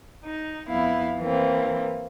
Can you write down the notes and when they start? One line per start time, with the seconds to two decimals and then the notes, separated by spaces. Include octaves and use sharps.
0.25 D#4
0.69 F2 B3 E4 F5
1.20 E3 A#3 C4